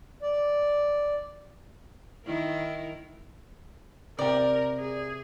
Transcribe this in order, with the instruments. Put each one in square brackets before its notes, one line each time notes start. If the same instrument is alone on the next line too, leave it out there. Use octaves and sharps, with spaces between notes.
[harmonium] D5
[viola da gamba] D#3 E4 A#4
[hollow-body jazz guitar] C3 G5 [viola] A#4 [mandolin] D5
[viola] G#4